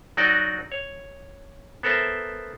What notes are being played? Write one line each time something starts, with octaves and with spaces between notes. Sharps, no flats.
F#3 D#4 F#4 D5 D#5
C#5
B3 A4 A#4 C5 E5